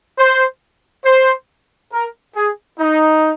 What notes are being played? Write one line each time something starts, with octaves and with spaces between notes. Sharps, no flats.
C5
C5
A#4
G#4
D#4